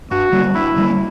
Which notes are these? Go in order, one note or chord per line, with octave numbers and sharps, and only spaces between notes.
G2 F#4
D3 G3 A#3
G2 E4
D3 G3 A#3